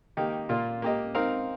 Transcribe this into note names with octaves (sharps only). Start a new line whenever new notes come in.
D#3 A#3 D#4 G4
A#2 A#3 F4
A#3 G4 D#5
C4 D#4 A#4 F5